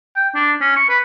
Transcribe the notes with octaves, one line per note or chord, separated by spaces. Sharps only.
G5
D4
C#4
C#6
B4